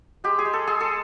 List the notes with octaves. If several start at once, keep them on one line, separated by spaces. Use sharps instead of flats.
G#3 G4
G#4
G#3
A4
G#3 G#4
A4